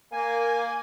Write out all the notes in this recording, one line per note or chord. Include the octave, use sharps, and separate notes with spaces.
A#3 G#5